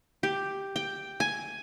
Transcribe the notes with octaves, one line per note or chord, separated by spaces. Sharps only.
G4
G5
G#5